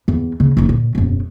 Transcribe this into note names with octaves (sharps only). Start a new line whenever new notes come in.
E2
C#3
F#1 D#4
A#2
E1 F#2